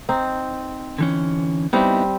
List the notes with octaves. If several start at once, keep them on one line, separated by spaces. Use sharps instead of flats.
C4 D#4
D3 E3 C#4
G3 B3 C4 D#4 E4